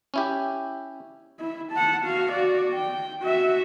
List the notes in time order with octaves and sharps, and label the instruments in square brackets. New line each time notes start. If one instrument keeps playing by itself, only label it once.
[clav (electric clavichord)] C#4 E4 G4
[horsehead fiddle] E4
F#5 A5
F#4 F5
F#4 D5
G5
F#4 E5